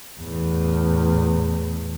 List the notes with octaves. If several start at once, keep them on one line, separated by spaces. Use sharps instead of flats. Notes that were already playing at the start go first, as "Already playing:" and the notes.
E2 A2